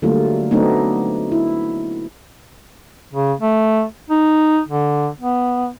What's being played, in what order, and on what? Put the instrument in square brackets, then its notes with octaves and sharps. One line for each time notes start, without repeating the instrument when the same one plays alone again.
[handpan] D3 F#3 G3 A3 A#3 F4
F#3 A3 B3 C4 D4 D#4
E4
[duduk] C#3
A3
D#4
D3
B3